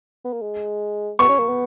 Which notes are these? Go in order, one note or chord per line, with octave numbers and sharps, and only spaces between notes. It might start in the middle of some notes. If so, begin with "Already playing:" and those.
B3
A#3
G#3
B3 C#6
C#4
A#3
B3